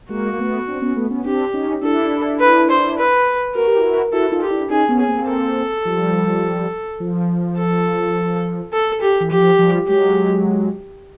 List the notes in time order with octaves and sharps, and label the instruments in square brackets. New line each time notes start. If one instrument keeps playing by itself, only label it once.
[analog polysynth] G#3 A#3 [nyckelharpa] F#4
[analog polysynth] A#3
A3 B3
C4 D4
B3 C#4
A3 B3
B3 C#4
[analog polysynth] C4 D4 [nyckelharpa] G4
[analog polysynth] C#4 D#4
[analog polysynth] D4 E4 [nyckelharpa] A4
[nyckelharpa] B4
C5
B4
[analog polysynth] F#4 [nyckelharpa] A#4
[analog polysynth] G4
E4 F#4
[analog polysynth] E4 F#4 [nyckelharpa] A4
[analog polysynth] D#4 F4
[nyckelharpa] G4
[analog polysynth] D4 E4
[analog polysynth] C#4 D#4 [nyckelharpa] G#4
[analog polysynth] B3 C#4
[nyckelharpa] G#4
[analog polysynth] A#3 C4
[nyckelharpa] A4
[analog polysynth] F3 G3
F3
[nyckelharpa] A4
A4
G4
[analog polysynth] E3
[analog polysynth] F3 [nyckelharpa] G4
[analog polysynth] F3 G3
[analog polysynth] F#3 G#3 [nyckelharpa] G4